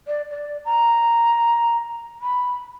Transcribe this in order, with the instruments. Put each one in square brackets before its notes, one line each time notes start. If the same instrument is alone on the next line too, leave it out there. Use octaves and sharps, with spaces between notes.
[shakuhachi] D5
D5
A#5
B5